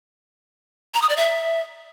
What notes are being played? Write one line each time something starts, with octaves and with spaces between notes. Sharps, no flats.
A#5
D#6
D5
E5